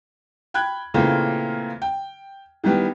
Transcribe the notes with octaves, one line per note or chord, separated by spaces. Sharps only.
G5 B5 F#6 G#6
A#2 C#3 E3 A3 A#3 C4
G5
D#3 E3 G3 B3 G4